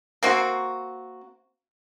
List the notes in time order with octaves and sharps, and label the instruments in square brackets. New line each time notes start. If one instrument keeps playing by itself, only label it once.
[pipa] A#3 C4 F#4